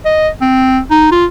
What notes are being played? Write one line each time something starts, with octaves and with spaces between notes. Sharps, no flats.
D#5
C4
D#4
F4